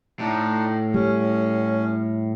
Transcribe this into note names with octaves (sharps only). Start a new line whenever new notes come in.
A2 D4 D#4
G3 C#4